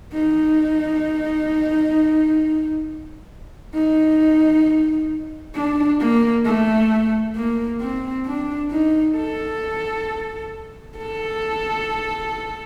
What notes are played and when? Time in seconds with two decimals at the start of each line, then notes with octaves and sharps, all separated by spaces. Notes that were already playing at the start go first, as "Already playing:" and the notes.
0.13 D#4
3.74 D#4
5.55 D4
6.00 A#3
6.45 A3
7.36 A#3
7.81 C4
8.26 D4
8.72 D#4
9.16 A4
10.97 A4